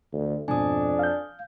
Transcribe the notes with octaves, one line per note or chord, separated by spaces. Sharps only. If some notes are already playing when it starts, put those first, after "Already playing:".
D2
F2 G#2 B2 D4 G#5 D#6
F5 G6